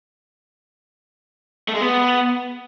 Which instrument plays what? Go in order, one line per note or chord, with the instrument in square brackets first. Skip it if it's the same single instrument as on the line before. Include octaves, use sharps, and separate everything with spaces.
[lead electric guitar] A3
G#3
B3